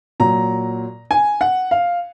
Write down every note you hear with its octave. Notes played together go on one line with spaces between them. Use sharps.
A#2 F#3 A#5
G#5
F#5
F5